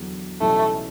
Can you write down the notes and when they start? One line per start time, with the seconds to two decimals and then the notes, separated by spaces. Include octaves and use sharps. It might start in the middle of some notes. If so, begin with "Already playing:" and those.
Already playing: E2 D3 F#3
0.41 B1 A2 E3 G3 A3 C#4